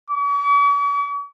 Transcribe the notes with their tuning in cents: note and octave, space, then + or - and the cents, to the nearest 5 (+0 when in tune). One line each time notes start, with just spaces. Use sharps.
C#6 +45